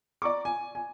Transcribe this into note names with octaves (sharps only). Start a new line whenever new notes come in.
D5 A#5 C#6 D6
G#5
G#5